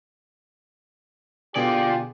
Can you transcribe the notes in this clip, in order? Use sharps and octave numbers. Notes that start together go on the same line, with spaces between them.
B2 D3 F4 G4 G#4 D5